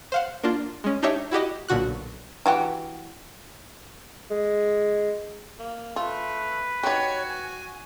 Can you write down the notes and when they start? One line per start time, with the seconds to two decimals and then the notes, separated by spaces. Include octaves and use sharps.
0.12 C5 F5 F#5
0.44 A#3 D4 F4
0.84 G#3 C#4
1.02 D4 D#4 G4 C#5 E5
1.31 E4 F#4 G4 D#5
1.68 B1 A#2 D3 F#4 F#6
2.46 E3 F#4 G4
4.31 G#3
5.59 A#3
5.96 A3 F4 B4
6.83 D#4 F#4 G4 C#5
7.28 G#5